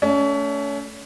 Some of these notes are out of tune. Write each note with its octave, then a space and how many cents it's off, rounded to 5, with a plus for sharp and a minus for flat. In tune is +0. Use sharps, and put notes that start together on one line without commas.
A3 +0 C#4 +30